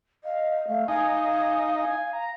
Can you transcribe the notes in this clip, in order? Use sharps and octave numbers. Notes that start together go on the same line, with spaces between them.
D#5 F5
A3 F5
D#4 F5 G#5
G#5
A#5